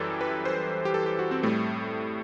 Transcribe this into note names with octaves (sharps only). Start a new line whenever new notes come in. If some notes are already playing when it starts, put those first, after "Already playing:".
Already playing: F#2 E3 G3 G4 A4
B4
C5
G4
A4
G4
F#4
C4
A2 G3 A3